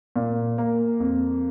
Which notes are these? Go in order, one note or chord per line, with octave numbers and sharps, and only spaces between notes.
A#2
A#3
F2